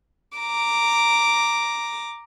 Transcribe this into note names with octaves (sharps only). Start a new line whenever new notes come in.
A#5 D6